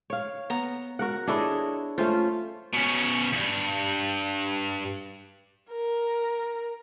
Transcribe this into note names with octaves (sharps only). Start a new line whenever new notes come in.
C#5 F5
B3 A#5
F#4 A#4 F#5
D4 E4 G#4 A4 C#5 D#5
A3 C#4 F4 C5
B2 C#4
E2 G2
A#4